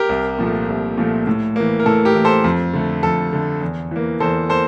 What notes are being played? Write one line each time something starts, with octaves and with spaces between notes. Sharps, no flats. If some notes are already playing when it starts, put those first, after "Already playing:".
Already playing: G4 A#4
C2
A#2 F3 A3
C2
A#2 F3 A3
A2
E3 A#3
A#4
A2 A4
G4 A#4
E3 A#3
A4 C5
F2
D3 A3
F2 A4
D3 A3
E2
E3 A#3
E2 A4 C5
A#3 A4 C5